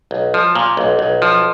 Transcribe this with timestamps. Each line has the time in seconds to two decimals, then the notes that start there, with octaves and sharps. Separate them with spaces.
0.11 B1
0.34 F3
0.55 A#2
0.77 B1
0.99 B1
1.22 F3